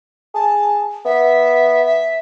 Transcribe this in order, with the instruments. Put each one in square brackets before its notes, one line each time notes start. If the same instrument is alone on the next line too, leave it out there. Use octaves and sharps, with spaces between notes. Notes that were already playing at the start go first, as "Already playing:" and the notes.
[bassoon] G#4 [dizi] A5
[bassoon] B3 [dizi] E5
[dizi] E5